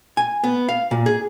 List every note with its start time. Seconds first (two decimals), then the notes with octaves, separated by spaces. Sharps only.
0.17 G#5
0.44 B3
0.69 F5
0.91 A#2
1.06 G#4